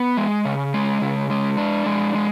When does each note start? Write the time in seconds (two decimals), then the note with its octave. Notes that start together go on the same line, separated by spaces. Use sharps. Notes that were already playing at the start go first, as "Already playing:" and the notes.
Already playing: B3
0.17 G#3
0.45 C#3
0.74 G#3
1.01 C#3
1.30 G#3
1.57 D4
1.86 G#3
2.15 G#3